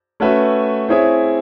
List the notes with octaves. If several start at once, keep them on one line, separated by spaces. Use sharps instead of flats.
A3 C#4 F#4 B4 E5
C4 E4 G#4 C#5 E5